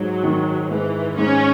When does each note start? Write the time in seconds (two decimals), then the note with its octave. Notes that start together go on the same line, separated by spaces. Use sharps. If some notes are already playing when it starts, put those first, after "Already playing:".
Already playing: G#2 F#3
0.23 D#3
0.70 G#2 E3
1.17 G#2 C#4